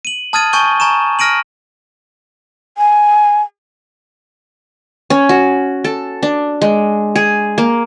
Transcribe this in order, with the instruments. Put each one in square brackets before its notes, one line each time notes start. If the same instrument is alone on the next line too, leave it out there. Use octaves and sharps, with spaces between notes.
[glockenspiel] D#7 F#7
A5 D#6 F6 G#6 A6 D#7
G#5 A5 C#6 G6 D#7 G7
G#5 A#5 C#6 E7
F6 A#6 D7 D#7 F#7
[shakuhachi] G#5
[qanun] C#4
F#4
A4
D4
G#3
G#4
A#3